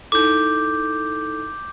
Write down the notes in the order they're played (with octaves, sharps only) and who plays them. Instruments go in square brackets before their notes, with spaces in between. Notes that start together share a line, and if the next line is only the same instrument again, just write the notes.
[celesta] D#4 E4 A4 [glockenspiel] D6 G6